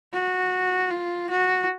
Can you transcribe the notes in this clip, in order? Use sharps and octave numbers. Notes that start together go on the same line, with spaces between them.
F#4
F4
F#4